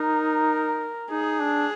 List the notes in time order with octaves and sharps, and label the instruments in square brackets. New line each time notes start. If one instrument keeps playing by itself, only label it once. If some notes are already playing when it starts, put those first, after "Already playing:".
Already playing: [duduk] D#4 [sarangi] A#4
[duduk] D#4 [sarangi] G#4
[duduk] D4